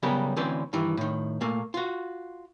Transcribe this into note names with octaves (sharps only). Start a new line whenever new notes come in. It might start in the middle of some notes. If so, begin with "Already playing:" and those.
C#3 F#3 G3 B3 A#4 B4
D2 E3 C4 C#4 B4 D5
G2 D#3 E3
A2 D#3
A#2 A3 A#3
F4 F#4